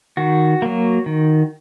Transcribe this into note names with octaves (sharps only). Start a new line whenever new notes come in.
D#3 F#4
F#3 A#3
D#3